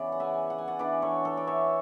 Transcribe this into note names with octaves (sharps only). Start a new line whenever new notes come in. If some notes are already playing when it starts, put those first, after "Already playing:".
Already playing: C#3 E3 B3 D5
F#5
E5 G#5
F#5
G#5
D5 F#5
E3 B3 D4 B4 D5
A4 C#5
A4 C#5
D5
C#5 E5